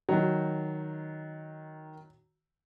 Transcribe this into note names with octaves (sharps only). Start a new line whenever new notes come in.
D#3 F#3